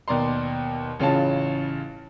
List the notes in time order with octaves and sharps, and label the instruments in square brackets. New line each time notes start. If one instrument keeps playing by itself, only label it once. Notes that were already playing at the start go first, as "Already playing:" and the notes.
[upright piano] D#2 B2 D5 A#5 C6
A1 C#3 C#4 F4 A5